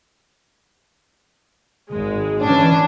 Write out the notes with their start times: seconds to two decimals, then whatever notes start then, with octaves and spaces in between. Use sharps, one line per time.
1.89 G#1 G#3
2.43 E3 C#4 D4